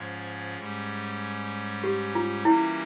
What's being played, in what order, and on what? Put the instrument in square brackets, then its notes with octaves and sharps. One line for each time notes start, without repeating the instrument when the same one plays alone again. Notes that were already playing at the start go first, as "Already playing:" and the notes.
Already playing: [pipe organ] G#2 F3 G#3 C#4
G#2 G3 C#4
[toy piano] G4
F4
[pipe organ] E3 G3 A#3 C#4 [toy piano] E4